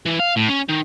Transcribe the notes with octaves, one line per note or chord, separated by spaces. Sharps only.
E3
F5
A2
C#4
D#3